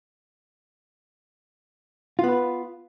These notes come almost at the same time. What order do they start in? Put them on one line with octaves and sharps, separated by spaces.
F4 B3 B4